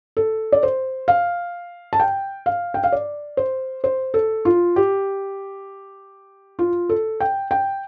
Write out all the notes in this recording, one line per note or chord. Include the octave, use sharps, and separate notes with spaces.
A4
D5
C5
F5
A5
G5
F5
G5
F5
D5
C5
C5
A4
F4
G4
F4
A4
G5
G5